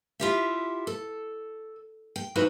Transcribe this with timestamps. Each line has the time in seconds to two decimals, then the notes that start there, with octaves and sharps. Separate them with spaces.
0.20 E4 F4 G4 E5
0.87 A4
2.16 G5
2.35 E3 D#4 F#4 B4 C5